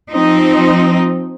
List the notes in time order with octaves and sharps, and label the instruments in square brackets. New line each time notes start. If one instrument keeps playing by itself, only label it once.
[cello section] F3 C4 D#4